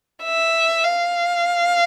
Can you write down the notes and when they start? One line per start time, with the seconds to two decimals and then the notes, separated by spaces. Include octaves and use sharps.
0.23 E5
0.83 F5